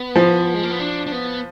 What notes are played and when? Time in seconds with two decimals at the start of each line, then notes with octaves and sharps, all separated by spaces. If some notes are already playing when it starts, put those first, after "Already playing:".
Already playing: B3
0.16 F3
0.54 G#3
0.63 A#3
0.71 B3
0.79 D4
1.06 D4
1.12 B3